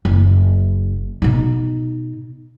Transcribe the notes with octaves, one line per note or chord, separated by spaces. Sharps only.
F#1
B2 D#4